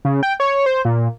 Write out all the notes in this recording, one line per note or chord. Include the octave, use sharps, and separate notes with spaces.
C#3
G5
C#5
C5
A#2